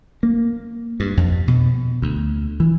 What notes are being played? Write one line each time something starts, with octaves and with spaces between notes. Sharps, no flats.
A#3
G2
F2
B2
D2
E3